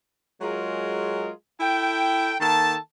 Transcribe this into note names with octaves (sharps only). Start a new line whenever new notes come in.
F#3 G#3 F4 G#4 A#4
E4 A4 G5
D#3 A#3 A4 A5